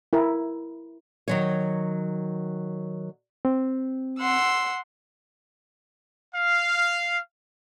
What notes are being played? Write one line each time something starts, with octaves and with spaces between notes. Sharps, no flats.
E4 A#4
D#3 F#3 C#5
C4
F#5 C6 E6
F5